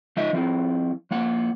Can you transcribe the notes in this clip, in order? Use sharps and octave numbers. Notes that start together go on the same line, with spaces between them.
F3 D#4 D#5 E5
F3 C4 E4
F3 A#3 F#5